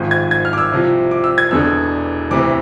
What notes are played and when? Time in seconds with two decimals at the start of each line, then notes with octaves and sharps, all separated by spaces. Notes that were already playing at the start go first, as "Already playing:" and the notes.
Already playing: G#1 G#2 F3
0.11 G#6
0.31 G#6
0.45 F6
0.53 D6
0.58 E6
0.72 C2 C3 F3
1.11 D6
1.24 E6
1.38 G#6
1.51 E1 E2 D3 E6
2.31 D2 C3 E3 D6